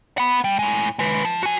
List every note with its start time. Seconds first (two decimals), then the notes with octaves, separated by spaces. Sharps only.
0.18 F#5 B5
0.44 G3
0.59 A2 G#3
0.99 G#3 B4
1.25 F3
1.43 F#4 G#5